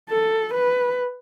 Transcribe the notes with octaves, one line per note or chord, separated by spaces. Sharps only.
A4
B4